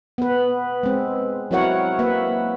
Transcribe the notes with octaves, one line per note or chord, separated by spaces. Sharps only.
B3 B4
G#3 C4
F#3 C4 E4 A#4 C#5 F#5
A#3 B4 E5